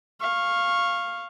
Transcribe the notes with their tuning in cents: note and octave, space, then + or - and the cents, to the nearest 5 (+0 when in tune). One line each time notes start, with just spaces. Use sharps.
F5 +0 C#6 -20